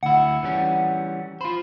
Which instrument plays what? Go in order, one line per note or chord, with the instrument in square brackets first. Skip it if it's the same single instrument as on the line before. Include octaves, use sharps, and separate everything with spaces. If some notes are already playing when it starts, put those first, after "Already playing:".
[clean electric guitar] D2 E4 [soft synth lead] F#5
[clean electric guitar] E3 G3 C#4
[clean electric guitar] F4 C5 [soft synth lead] B5